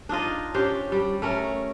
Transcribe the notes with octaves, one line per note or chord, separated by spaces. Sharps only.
D4 D#4 F4 D#5
C#4 D4 G4 C5
G3
A3 C#4 A#4